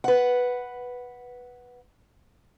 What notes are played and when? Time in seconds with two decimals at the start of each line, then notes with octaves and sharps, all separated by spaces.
0.04 B4 F#5